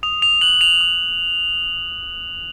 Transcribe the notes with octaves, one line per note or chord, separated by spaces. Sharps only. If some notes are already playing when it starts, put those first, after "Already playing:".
D#6 F7
F7
F#6 F#7
F7
D#6